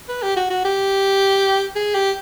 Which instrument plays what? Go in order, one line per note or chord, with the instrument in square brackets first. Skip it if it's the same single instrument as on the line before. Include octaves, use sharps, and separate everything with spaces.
[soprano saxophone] B4
G4
F#4
F#4
G4
G#4
G4